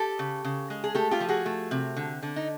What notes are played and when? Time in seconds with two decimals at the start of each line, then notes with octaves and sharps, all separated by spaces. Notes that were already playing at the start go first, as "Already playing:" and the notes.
Already playing: G4 A4
0.19 C#3
0.44 C#3
0.70 G#3
0.84 G#4
0.95 A3 G4 A4
1.11 F4 G4
1.20 F3
1.29 F#4 G#4
1.46 A3
1.71 C3
1.96 D3
2.22 D3
2.36 D#4